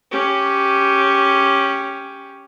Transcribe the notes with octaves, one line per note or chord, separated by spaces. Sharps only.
C#4 G4